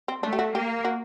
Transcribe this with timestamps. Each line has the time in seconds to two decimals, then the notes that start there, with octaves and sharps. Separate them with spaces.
0.08 C4
0.23 A3 D4
0.33 G4
0.39 F#4
0.54 A#3 G4
0.85 F#4